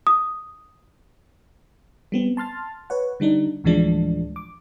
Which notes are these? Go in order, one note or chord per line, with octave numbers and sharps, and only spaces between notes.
D#6
G3 B3 C4
A5 C6 F6 A6
B4 C#5 F#5
D3 G3 D4 D#4
D2 A2 E3 F3 G#3 D4
D6